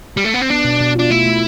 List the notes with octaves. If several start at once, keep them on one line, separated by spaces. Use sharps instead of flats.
G3
A3
B3
C4
B3 D4
B2
B2
D4 F4
A3 E4
A3